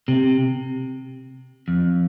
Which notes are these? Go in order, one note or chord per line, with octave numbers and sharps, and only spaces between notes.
C3
F2